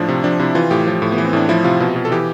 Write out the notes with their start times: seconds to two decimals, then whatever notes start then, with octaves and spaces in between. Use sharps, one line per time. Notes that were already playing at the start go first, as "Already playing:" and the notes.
Already playing: A2 F3 D4
0.09 C3
0.24 F3 D4
0.39 C3 E4
0.55 E3 F4
0.71 A2 G4
0.87 F3
1.02 A2
1.12 B3
1.18 E3
1.25 C4
1.33 A2 D4
1.49 F3 E4
1.64 C3 F4
1.80 B2
1.96 B2
2.05 A4
2.11 E3 G4